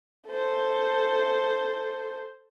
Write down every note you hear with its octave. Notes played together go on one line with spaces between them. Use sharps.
A4 C5